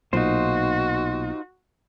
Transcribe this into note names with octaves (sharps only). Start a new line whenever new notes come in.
B1 A#2 D#4 F4 F#4 C5